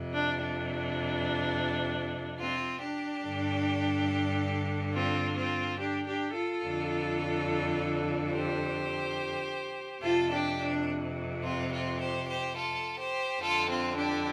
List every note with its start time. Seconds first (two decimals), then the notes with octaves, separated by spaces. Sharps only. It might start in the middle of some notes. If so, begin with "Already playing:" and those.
Already playing: F2 C3
0.14 D4
0.42 D4
2.40 C4 F4
2.82 D4 G4
3.24 G2 D3
4.94 C4 F4
5.36 C4 F4
5.78 D4 G4
6.06 D4 G4
6.35 F4 A4
6.64 F2 D3
8.32 G4 C5
10.02 F2 C3 F4 A4
10.30 D4 G4
10.59 D4
11.43 C4 F4
11.71 C4 F4
12.00 G4 C5
12.28 G4 C5
12.56 F4 A4
12.98 G4 C5
13.41 F2 D3 F4 A4
13.69 C4 F4
13.97 D4 G4